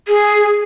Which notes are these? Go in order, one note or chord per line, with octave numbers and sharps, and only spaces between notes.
G#4